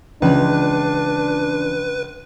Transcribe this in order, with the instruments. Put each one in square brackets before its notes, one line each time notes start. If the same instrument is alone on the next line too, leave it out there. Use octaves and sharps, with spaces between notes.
[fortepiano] C#2 [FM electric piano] E3 F3 C#4 [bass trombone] D4 [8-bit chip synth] B4